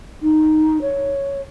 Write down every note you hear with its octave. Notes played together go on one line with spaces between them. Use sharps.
D#4
C#5